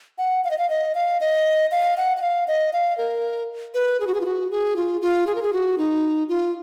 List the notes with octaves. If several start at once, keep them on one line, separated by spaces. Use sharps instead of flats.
F#5
F5
D#5
F5
D#5
F5
D#5
F5
F#5
F#5
F5
D#5
F5
A#4
B4
G#4
F#4
G#4
F4
F#4
G#4
F4
F4
G#4
A#4
G#4
F#4
D#4
F4